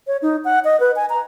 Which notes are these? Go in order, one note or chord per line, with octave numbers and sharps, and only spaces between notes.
C#5
D#4
F#5
D#5
B4
G#5
A#5